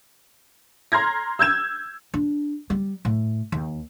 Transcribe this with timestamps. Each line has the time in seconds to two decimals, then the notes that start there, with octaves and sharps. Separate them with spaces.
0.92 A#5 C6 F6 G#6 A#6
1.39 E6 G6 G#6 E7
2.14 D4
2.70 G3
3.05 A2
3.52 D#2